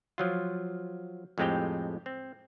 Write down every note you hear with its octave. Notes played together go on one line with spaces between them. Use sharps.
F3 F#3 F4
F2 A2 G#3 C4 G4 G5
C4